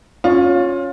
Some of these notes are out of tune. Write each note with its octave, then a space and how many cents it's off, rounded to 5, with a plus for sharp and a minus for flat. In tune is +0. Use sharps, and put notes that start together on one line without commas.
C#4 +0 F4 +20 C#5 +0